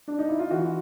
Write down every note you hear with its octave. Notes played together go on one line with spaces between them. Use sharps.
D4
D#4
E4
F4
E3 F#4